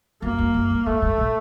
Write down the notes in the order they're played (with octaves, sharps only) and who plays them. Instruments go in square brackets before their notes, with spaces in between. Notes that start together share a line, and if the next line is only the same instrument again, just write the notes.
[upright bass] F#2 [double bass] A#3
[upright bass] F#2
F#2
G2
[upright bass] G#2 [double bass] A3
[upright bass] G#2
A#2